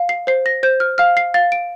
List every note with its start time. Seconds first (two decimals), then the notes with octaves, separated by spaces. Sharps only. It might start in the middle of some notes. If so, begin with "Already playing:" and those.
Already playing: F5
0.09 C7
0.27 C5 C7
0.46 A#6
0.63 C5 G6
0.80 F6
0.98 F5 F6
1.17 C7
1.34 F5 A6
1.52 D7